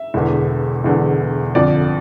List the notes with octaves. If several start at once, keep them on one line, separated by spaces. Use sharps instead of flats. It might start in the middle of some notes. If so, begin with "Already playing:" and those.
Already playing: E5
E1 E2 D3
E1 E2 D3
G1 F2 D3 F3 D5